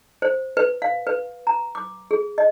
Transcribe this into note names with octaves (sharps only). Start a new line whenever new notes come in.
C5
B4
F5
B4
A#5
D6
G#4
D#5